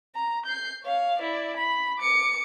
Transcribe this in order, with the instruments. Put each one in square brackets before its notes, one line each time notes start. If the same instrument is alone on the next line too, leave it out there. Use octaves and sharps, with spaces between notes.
[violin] A#5
G6 C7
C#5 F5
E4 D5
B5
D6 C#7